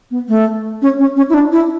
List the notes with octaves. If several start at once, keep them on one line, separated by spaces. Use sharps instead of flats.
B3
A3
C#4
C#4
C#4
E4
D4
E4